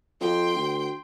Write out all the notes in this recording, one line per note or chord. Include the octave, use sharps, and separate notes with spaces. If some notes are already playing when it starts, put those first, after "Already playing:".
F2 G5 C6
D2